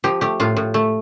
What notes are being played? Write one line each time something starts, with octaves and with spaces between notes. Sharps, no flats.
F3 G4
A3 G4
A2 F4
A2
A3